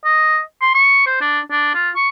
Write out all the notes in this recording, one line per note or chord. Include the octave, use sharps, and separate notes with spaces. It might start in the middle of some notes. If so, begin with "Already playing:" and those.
D#5
C6
C#6
C5
D4
D4
F4
C#6